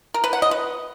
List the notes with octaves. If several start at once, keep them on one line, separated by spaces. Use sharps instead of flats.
A#4
B4
F#5
D#5
B4